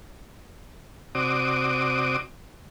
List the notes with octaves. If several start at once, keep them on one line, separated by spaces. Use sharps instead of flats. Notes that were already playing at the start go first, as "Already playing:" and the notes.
C3 C4 F#4 D5 D6 D#6